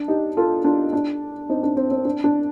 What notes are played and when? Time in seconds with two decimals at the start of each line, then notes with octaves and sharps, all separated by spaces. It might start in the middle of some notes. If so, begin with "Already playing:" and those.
Already playing: D4
0.08 D#4 G4
0.37 F4 A4
0.64 D4 F4
0.93 D4
1.49 C4 D#4
1.63 D4
1.77 C4
1.91 C4
2.05 D4
2.24 D4